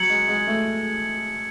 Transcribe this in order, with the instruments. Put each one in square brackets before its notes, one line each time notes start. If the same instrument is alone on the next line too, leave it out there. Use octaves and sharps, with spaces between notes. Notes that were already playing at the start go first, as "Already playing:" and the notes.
Already playing: [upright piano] F#3 [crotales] G#6 C#7 F#7
[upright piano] G#3
G#3
A3